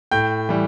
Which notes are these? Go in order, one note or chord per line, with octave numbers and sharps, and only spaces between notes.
A2 G5 G6
E3 G3